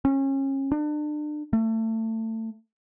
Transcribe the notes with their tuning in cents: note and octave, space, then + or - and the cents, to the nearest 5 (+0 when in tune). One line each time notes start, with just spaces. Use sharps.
C#4 -30
D4 +35
A3 +25